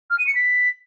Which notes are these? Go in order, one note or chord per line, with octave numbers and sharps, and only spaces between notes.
F6
D#7
C#7
B6